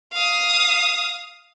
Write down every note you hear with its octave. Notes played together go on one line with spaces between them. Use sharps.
F5 D#6